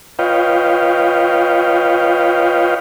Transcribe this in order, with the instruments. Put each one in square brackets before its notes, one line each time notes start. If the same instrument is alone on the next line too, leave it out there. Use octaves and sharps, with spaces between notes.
[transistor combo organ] F4 B4 C#5 D#5 F5 G5